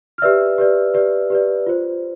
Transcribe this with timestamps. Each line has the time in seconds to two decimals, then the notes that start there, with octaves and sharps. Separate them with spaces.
0.18 F6
0.22 G4 B4 D5 E5 E6
0.58 G4 B4 D5
0.94 G4 B4 D5
1.30 G4 B4 D5
1.67 F4 C5